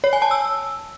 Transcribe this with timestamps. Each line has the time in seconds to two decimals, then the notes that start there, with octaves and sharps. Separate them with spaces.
0.04 C#5
0.13 G#5
0.22 A5
0.31 E6